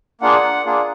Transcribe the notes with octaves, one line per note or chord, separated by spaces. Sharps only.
A#3 D4 F4 G#4 F#5
A#3 D4 F4 G#4